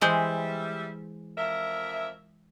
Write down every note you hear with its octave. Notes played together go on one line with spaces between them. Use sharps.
E3 G3 G#3 C5 E5
F2 A#4 E5